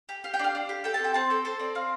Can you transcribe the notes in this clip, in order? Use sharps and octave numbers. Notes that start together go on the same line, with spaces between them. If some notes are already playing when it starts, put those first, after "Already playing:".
G4
G4 F5
G5
D4 F5
D4
G4
A4 G5
A5
C4
G5
C4 A5
A4 G5
A4 C5
C4 D5
C4 F5